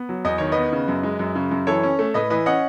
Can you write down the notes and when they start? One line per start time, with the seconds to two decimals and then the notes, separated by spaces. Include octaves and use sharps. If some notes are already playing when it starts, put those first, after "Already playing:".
Already playing: B3
0.09 F#3
0.25 E2 D#5
0.38 D#3 C#5
0.52 B3 B4 D#5
0.72 C#3
0.88 F#2
1.03 G#3
1.19 F#2
1.35 C#3
1.51 F#2
1.67 E3 A4 C#5
1.83 C#4
1.99 A3
2.14 A2 B4 D#5
2.30 E3 B4 D#5
2.46 C#4 D#5 F#5